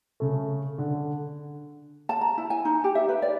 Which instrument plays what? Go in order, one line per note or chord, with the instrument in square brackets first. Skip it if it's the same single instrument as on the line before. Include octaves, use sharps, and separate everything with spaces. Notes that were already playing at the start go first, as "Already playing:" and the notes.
[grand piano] C#3 A3
D3
[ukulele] A5
A#5
E4
G#5
D#4
G4
E5
B4
D5